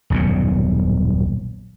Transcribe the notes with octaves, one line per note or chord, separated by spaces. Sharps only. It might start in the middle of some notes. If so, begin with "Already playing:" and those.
D#1 B1 F#2 A#2